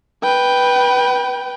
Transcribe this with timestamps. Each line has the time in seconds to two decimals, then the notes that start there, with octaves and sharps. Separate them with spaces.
0.23 B4 G5